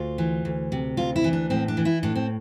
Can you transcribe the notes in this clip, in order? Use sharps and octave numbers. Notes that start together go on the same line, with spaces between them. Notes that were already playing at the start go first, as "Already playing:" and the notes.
Already playing: D2 F4
E3
D2
C3
D2 F4
E4
E3
D4
A2 C4
D4
E3
E4
A2 D4
C4